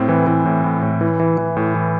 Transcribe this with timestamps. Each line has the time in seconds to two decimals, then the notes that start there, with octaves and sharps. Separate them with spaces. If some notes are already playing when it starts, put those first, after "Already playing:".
Already playing: A2 C4
0.09 E3
0.27 E3
0.45 A2
0.64 A2
0.82 A2
1.01 E3
1.20 E3
1.38 E3
1.57 A2
1.75 E3